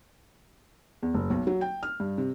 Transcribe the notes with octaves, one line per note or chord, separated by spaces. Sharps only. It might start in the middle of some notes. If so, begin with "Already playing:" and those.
E2
F#1
B1
F#3
G5
F6
G2
C3